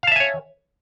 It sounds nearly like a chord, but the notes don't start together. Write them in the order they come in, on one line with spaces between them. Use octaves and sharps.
F5 A5 E5 G#5 C#5